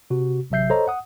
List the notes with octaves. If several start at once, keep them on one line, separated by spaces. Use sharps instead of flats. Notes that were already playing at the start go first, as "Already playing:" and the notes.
C3 F#4
A1 C3 F#3 E5 G6 C7
A4 C5 C#5 D#5 A#5
F#5 D#6